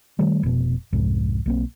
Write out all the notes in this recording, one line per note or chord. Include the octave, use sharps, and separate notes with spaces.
D#3 G3 A3
F1 B2
C2 F2 G#2
B1 A#3 C4